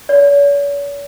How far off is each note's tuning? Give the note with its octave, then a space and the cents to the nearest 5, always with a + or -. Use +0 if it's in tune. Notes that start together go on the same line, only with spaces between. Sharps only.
C#5 +45